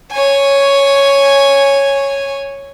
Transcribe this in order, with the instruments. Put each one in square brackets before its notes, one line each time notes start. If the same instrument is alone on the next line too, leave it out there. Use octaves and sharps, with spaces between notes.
[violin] C#5 G#5